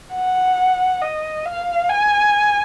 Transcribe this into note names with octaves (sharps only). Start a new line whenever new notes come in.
F#5
D#5
F5
G#5